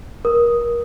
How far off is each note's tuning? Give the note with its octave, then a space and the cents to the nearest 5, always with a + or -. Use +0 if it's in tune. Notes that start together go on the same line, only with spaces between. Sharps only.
A#4 +30 D#6 +0